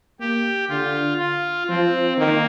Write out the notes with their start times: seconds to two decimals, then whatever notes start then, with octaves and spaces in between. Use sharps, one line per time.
0.20 A#3 G4
0.69 D3 F4
1.19 F4
1.69 F3 C4
2.18 D#3 A#3